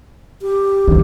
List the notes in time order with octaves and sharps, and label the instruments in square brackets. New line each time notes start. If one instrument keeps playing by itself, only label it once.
[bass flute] G4
[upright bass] D#3 G3